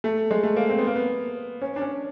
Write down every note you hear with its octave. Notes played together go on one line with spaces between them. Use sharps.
A3
G#3
A3
A#3
C4
B3
A#3
B3
C#4
D4
C#4